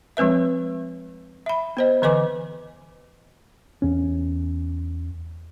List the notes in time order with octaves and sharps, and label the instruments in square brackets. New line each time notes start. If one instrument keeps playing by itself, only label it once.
[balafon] F3 G#3 C4 B4 E5
E5 B5
B3 C5 D#5
D3 E3 B4 D#5 G#5 D6
[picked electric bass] E2 C#4